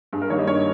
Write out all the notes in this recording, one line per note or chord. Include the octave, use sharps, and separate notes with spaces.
G2 G#4
A#4
D#3 G3 A#3 C#5
D#5
G2 C#5